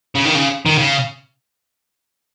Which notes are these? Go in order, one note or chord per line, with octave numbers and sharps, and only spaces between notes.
C#3
D#3
C#3
D#3
C#3